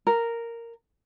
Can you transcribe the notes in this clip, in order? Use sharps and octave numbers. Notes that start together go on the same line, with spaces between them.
A#4